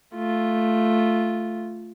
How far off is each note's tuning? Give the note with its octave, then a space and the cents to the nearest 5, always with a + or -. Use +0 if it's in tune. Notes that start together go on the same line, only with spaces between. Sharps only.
A3 +0 F4 +0